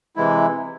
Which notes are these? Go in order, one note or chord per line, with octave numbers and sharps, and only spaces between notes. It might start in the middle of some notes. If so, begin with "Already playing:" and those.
C3 E3 G#3 E4